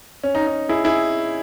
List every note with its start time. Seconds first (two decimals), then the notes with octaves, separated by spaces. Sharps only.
0.23 C#4
0.35 D#4
0.47 D#4
0.69 E4 G#4
0.84 E4 G#4